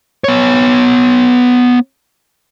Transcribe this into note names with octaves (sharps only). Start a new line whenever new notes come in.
B3 C#5